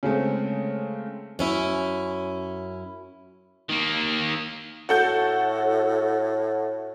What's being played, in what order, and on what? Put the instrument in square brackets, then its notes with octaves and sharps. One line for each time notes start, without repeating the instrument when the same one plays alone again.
[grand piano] C#3 G#3 A3 C4
[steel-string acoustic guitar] F#2 C#4 E4
[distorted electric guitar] D#3 A#3
[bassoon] A2 [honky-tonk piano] F#4 A4 G6